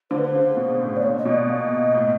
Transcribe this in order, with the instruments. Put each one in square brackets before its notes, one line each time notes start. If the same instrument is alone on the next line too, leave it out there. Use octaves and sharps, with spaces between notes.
[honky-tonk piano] D3 [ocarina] C5
[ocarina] B4
C5
[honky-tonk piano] C#3
B2
A2
[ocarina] D5
[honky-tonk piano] A#2 [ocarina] C#5
[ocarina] D#5
[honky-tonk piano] B2
[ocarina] D5
[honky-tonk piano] A#2 [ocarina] D#5
[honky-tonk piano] A2